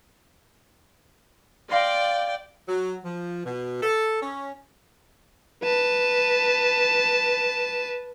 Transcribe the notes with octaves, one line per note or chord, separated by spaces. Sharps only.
D5 F5 G5 C6 A#6
F#3
F3
B2
A4
C#4
B4 A5